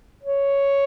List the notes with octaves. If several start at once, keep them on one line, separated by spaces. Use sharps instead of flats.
C#5